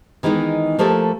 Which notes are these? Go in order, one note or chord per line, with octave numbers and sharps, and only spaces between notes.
D#3 E3 G#3 B3 D#4
F3 A3 A#3 G4 A4